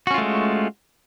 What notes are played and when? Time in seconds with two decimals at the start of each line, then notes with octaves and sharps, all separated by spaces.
0.07 F#4
0.11 C#4
0.14 F4
0.18 A3
0.21 G#3